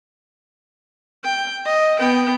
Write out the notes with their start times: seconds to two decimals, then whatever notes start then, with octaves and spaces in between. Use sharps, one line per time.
1.24 G5
1.65 D#5
1.99 B3 G5